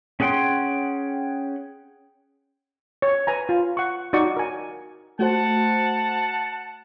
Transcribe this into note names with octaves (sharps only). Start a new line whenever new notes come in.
C#4 G#4 F#5 G5 C6
C#5
B4 G#5 A#5
F4
F#5 C#6
D#4 F#4 D5 C#6
A#4 G#5
A3 F#4 C5 F#5 A5